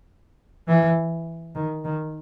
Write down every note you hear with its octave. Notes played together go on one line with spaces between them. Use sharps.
E3
D#3
D#3